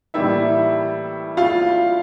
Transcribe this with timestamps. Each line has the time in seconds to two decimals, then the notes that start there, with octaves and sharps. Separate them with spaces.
0.14 A2 E3 G3 A#3 E4 E5
1.37 F4 F5